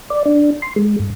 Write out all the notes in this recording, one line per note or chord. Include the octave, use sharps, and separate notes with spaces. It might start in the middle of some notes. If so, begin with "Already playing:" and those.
D5
D4
C6
G#3
G2